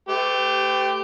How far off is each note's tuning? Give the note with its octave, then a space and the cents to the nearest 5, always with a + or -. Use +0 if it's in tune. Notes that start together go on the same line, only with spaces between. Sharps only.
A3 +0 G4 +0 B4 +45